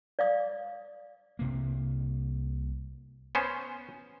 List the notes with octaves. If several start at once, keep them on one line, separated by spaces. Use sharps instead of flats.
D5 F5 D#6
C2 C3 A#3
B3 C#4 C5